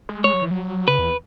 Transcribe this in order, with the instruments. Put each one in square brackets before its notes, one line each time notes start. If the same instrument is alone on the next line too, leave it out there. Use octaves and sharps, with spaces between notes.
[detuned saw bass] G#3
[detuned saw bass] G#3 [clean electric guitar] C#5
[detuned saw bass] F#3
E3
F#3
[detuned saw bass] C#3 [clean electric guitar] B4
[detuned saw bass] E2